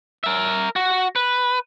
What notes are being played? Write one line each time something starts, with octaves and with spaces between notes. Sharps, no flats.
A#4 E5
F#4
B4